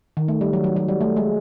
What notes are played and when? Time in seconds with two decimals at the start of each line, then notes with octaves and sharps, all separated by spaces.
0.17 D#3
0.28 A3
0.41 G3
0.53 F#3
0.64 F#3
0.76 F#3
0.88 G3
1.01 A3
1.16 G#3